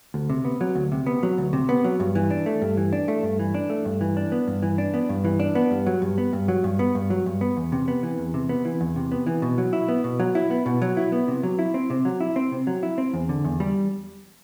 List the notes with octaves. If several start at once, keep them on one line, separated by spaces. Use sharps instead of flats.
D2
C3
B3
F#3
D2
C3
B3
F#3
D2
C3
B3
F#3
G2
E3
D4
A3
G2
E3
D4
A3
G2
E3
D4
A3
G2
E3
D4
B3
G2
E3
D4
B3
G2
E3
D4
B3
G2
F#3
G2
B3
G2
F#3
G2
B3
G2
F#3
G2
B3
E2
C3
B3
E3
E2
C3
B3
E3
E2
C3
B3
E3
B2
F#3
E4
B3
B2
F#3
E4
B3
B2
F#3
E4
B3
C3
F#3
E4
C4
C3
F#3
E4
C4
C3
F#3
E4
C4
E2
D3
E2
G3